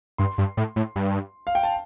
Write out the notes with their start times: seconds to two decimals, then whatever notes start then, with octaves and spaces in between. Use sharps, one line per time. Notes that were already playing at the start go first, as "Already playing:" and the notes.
0.18 G2 C6
0.38 G2
0.57 A2
0.76 A2
0.96 G2
1.47 F5
1.55 G5
1.63 A5